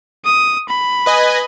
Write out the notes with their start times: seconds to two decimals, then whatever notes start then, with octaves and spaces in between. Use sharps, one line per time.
0.25 D#6
0.69 B5
1.06 B4 D#5 G#5